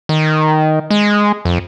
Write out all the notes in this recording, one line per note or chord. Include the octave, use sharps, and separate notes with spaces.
D#3
G#3
F2